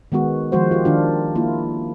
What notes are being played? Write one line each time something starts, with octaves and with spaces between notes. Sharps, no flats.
D#3 G#3 B3 F#4
D#3 F3 G#3 F#4 C5
F4 G4
D#3 D4 F4
A#3 E4 F4